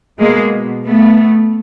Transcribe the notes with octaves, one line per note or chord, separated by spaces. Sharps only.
B2 G#3 A#3
A3 B3